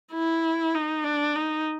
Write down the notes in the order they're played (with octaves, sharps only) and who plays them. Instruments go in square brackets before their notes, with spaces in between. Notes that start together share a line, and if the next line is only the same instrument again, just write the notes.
[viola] E4
D#4
D4
D#4